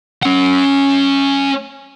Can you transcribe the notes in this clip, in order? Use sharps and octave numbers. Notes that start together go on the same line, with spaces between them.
C#4 F#5